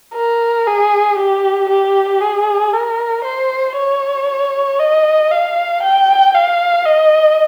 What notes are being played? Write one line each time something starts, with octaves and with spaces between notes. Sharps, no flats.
A#4
G#4
G4
G4
G#4
A#4
C5
C#5
D#5
F5
G5
F5
D#5